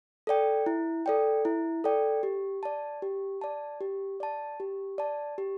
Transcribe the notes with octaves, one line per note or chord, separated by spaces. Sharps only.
A4 D5 G5
E4
A4 D5 G5
E4
A4 D5 G5
G4
D5 A5
G4
D5 A5
G4
D5 A5
G4
D5 A5
G4